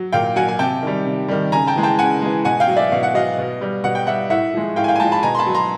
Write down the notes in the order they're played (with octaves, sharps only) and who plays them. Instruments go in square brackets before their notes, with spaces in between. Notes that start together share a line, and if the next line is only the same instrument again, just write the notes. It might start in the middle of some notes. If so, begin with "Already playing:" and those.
Already playing: [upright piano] F#3
A#2 F5 G5
F#3 F#5 G#5
G#5
C3 G5 A5
D#3 G3
C3
D#3 G3
C#3 G#5 A#5
G5 A5
E3 G#3
G5 A5
C#3 F#5 G#5
E3 G#3
B2 F#5 G#5
F5 G5
F#3
D5 E5
B2 F5
F#5
F#3 D#5 F5
B2
G3
B2 F#5
G5
G3 E5 F#5
A2 E5 F#5
F3 G#3
A2 F5 G5
G#5
F5 G5
G#5
F3 G#3 G5 A5
A5 B5
B2 G#5 A#5
C6
A5 B5
F#3
A#5 C6